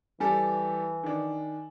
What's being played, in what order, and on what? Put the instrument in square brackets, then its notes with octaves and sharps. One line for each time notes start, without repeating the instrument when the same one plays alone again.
[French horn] E3 [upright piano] G3 G4 A4 [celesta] G#5
[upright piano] D#3 D4